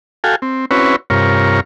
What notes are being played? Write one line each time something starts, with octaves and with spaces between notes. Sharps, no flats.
F#4 A4 F5 G5 G#5
C4
C4 C#4 E4 F#4 B4 C#5
G2 C3 F4 A#4 C#5